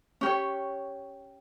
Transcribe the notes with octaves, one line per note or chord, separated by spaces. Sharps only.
C#4 G4 C#5